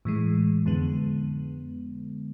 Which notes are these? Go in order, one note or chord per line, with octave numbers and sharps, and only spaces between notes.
A2 E3 G#3
F2 D3 G#3 B3